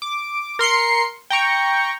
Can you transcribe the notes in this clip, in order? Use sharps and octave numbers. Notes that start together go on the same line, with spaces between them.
D6
A#4 C6 C7 C#7
G5 A#5 C#6